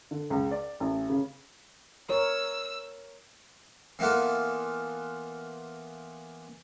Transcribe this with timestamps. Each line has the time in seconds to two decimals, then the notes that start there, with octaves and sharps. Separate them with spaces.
0.11 D3
0.30 C#2
0.51 D5
0.80 A1
1.10 C#3
2.09 A#4 C#5 E6
3.99 E3 A#3 B3 F4 A4